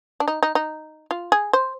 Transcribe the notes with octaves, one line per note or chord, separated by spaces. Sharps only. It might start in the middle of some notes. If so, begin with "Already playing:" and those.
D4
D#4
D#4
D#4
F4
G#4
C5